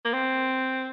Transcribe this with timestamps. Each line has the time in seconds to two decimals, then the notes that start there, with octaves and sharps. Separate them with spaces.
0.05 A#3
0.13 C4